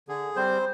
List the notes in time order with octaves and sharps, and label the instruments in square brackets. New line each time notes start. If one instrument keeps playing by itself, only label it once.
[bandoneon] D3 G#4
G3 C4 C5